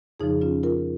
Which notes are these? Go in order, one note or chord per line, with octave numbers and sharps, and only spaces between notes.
F2 C#3 F3 D#4 G#4
C#4 F4
F4 A#4